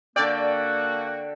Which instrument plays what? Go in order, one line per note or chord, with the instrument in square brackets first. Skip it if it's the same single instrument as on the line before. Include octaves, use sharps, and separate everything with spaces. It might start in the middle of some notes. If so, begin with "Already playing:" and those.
[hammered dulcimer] D3 A4 G5 [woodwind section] A#3 F#4 [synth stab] D5